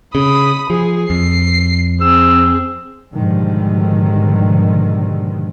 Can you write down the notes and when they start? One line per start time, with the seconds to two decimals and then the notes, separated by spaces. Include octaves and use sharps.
0.15 C#3 B5 D#6
0.70 F3 G#4
1.10 F2 C7
2.01 C4 G#4 E6
3.14 G#2 B2 D3 D#3 F3 G3